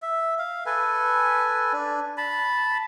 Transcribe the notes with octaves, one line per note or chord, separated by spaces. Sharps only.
E5
F5
A4 B4 G#5
D4
A5 B5